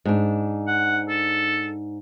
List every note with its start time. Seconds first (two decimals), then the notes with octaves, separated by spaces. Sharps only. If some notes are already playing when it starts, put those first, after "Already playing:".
0.05 G#2 D4
0.68 F#5
1.09 A4